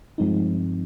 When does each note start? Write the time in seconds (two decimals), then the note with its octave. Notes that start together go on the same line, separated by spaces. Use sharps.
0.18 G2 F3 G#3 C4 D#4